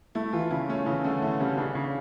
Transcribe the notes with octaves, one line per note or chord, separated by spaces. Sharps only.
A3 E4
E3 F4
C#3 E4
A3 C#4
C#3 E3
D3 A3
E3 A3
C#3 G3
C#3 D4
C#3